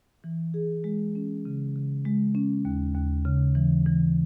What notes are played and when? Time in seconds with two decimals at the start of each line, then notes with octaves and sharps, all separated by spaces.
0.24 E3
0.54 G#4
0.84 G#3
1.15 C#4
1.45 C#3
1.76 C#3
2.05 G#3
2.35 C#4
2.65 D#2
2.95 D#2
3.25 C#3
3.55 E3
3.86 E3